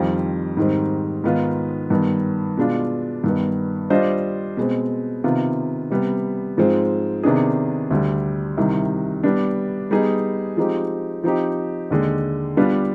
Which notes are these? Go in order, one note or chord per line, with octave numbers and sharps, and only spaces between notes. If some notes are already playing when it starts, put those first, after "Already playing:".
Already playing: F2 D#3 G3 C4 F4
G#2 D#3 G3 C4
G#2 D#3 B3 F4
G2 D#3 B3
B2 G#3 D4 F4
G2 D#3 B3
G3 D4 F4 C5 D#5
B2 G#3 C4
C3 D#3 B3 F4
C3 G3 B3
G#2 F3 G#3 C4
C3 D#3 B3 D4 G#4
D2 D3 G3
C2 C3 D#3 G3
G3 B3 D4
G3 B3 D#4 G#4
F3 G#3 C4 D#4 G4
F3 C4 D#4 G4
D#2 D3 G#3
G3 B3 D4 F4 B4